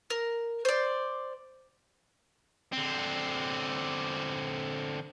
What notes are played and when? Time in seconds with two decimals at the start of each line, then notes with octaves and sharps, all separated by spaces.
0.10 A#4
0.65 C5 D5
2.73 D3 C4